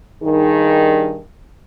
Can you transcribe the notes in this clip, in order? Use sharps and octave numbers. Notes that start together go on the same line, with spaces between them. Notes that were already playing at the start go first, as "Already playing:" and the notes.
G2 D#3 G#4